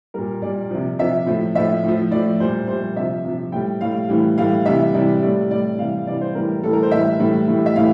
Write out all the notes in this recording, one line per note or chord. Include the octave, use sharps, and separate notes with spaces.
A#2 G3 A#4
A#2 G3 D5
C3 F3
C3 F3 E5
A2 F3
A2 F3 E5
A2 F3
A2 F3 D5
A#2 G3 C5
A#2 G3 C5
C3 F3 E5
C3 F3
A2 G3 G5
A2 G3 F5
A2 E3 G3
A2 E3 G3 F5
C3 E3 G3 E5
C3 E3 G3 D5
A2 G3 D5
A2 G3 D5
C3 E3 G3 F5
C3 E3 G3 D5
C5
A2 E3 G3 A#4
A2 E3 G3 A4
A#4
C5
A2 E3 G3 E5
A2 E3 G3
A2 E3 G3
E5
A2 E3 F5